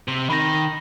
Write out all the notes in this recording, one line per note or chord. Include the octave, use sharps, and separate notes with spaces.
C3
D#3 B5 A#6